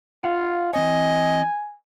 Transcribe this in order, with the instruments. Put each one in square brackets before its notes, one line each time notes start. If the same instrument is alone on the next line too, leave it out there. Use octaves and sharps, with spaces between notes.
[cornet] F4 [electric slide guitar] D#5 F5 F#5
[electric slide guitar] E3 C4 C#5 [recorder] D#5 [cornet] G#5